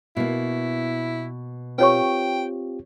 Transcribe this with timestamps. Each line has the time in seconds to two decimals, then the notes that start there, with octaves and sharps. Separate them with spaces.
0.17 B2 A#3 E4
1.78 C4 F4 G4 B4 C#5 G5 C#6